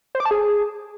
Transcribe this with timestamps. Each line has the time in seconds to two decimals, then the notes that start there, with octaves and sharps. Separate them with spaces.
0.15 C5
0.20 D6
0.25 A5
0.31 G#4